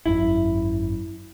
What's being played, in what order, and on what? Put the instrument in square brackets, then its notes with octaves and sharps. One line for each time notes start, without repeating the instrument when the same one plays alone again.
[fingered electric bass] G#1 F#2 [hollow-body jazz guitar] E4